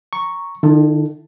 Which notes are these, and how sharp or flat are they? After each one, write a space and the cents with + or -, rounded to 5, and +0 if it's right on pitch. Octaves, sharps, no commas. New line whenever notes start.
A#5 +0 C#6 +0
D#3 -45 E4 +0 A4 +0